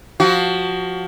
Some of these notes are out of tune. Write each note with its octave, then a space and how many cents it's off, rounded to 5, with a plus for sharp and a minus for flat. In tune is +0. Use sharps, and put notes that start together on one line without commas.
F3 +20 F#4 +25